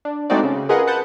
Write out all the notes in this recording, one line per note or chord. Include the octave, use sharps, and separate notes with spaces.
D4
G#3 A3 C4 D#4 F#4 D5
C#3
F4 G#4 A#4 B4 D#5 F#5
B4 F#5 A5 G6